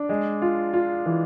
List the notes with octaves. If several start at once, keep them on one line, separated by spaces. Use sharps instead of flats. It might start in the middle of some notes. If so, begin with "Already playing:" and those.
Already playing: D4
G#3
F4
F4
E3